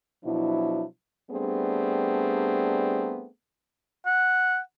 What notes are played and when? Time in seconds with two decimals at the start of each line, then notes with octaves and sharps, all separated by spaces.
0.25 B2 F3 F#3 D4 E4
1.30 G3 A3 B3 C4 D4 G#4
4.06 F#5